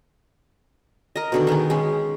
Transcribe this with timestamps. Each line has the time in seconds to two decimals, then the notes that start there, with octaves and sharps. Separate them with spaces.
1.16 A#4 D#5
1.32 B2 D3 D#3
1.47 D#3 B3 D#4 G#4
1.70 G#3 C#4